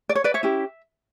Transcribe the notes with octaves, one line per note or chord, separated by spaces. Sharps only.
D5
C#5
B4 D5
C#5 E5
C#4 E4 G4